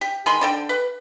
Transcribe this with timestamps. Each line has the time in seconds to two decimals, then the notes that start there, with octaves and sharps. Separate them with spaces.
0.01 G4
0.26 D#3 G#3 B5 C6
0.41 D3 A4 G5
0.69 B4